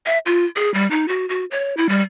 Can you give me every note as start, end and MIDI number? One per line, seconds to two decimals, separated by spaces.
0.06 0.18 76
0.26 0.45 65
0.56 0.73 68
0.74 0.89 55
0.91 1.08 63
1.08 1.26 66
1.29 1.45 66
1.51 1.76 73
1.77 1.89 64
1.89 2.02 55